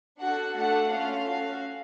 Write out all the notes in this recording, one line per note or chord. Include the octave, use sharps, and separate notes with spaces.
D4 F#4 A4 F#5
A3 D4 F#4 A4 F#5
A3 C#4 F4 A4 F5
C#4 F#4 A4